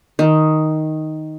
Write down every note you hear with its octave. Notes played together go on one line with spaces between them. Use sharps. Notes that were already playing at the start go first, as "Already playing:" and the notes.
D#3